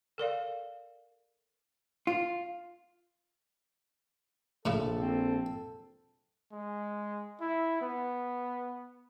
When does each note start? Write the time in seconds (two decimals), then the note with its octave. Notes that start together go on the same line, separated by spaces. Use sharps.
0.18 A4 A#4 D5 F5
2.07 F4
4.65 A#1 A2 C#3 E4 A4
4.98 C4
6.52 G#3
7.41 E4
7.81 B3